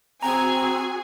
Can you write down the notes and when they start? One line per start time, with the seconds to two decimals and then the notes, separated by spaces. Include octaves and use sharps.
0.23 C4 F#4 G#4 G#5 A#5